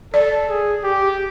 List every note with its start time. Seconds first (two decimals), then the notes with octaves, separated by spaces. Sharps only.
0.14 A4 D5
0.49 G#4
0.84 G4